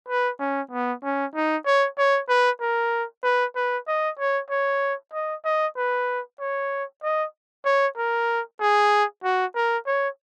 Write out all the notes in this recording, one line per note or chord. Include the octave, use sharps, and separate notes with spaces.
B4
C#4
B3
C#4
D#4
C#5
C#5
B4
A#4
B4
B4
D#5
C#5
C#5
D#5
D#5
B4
C#5
D#5
C#5
A#4
G#4
F#4
A#4
C#5